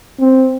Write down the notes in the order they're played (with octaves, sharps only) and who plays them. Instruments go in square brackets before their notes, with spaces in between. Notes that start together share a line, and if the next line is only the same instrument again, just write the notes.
[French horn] C4